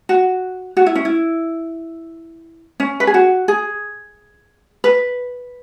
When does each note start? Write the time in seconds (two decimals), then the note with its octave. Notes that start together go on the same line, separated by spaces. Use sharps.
0.09 F#4
0.77 F#4
0.86 E4
0.95 C#4
1.05 E4
2.80 C#4
3.00 B4
3.07 G#4
3.14 F#4
3.48 G#4
4.84 B4